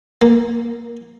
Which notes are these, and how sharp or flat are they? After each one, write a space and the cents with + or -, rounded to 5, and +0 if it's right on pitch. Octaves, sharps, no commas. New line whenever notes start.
A#3 +10